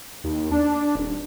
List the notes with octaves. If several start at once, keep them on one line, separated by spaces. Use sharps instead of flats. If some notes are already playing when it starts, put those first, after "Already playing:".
D#2
D4
D#1